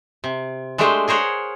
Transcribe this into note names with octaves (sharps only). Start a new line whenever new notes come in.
C3
G#3 A3 D4 G4 C5 G5
G#4 A#4 C5 C#5 F#5